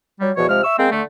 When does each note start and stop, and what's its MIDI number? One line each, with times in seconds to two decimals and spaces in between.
0.21 0.31 54
0.21 0.31 55
0.36 0.48 40
0.36 0.48 47
0.36 0.48 53
0.36 0.48 66
0.36 0.48 73
0.49 0.63 48
0.49 0.63 53
0.49 0.63 56
0.49 0.63 89
0.63 0.76 76
0.63 0.76 85
0.63 0.76 88
0.78 0.90 56
0.78 0.90 58
0.78 0.90 60
0.91 1.02 50
0.91 1.02 57